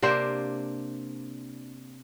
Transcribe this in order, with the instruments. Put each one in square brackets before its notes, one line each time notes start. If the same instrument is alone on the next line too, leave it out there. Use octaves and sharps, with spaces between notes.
[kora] C3 A#3 D4 C5